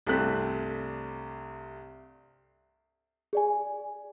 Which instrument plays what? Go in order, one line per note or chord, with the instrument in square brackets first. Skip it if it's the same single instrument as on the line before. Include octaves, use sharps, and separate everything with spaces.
[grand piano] C2 G2 A3 C4 F#6 B6
[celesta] G#4 D5 G#5